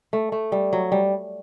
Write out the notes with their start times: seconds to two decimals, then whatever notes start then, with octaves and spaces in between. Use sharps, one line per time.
0.13 A3
0.32 A3
0.52 G3
0.73 F#3
0.92 G3